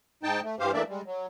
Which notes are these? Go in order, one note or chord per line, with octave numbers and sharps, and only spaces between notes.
G#2 D#4 G5 A5
A3
G2 E3 G4 C5 F5
E3 A3 A#3 D4 D5 E5
G3 G#3
F#3